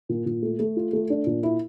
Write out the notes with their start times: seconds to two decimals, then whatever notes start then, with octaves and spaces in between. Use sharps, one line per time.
0.09 A#2
0.26 A#2
0.42 A3
0.59 A3
0.76 F4
0.93 A3
1.10 D4
1.26 A#2
1.43 E4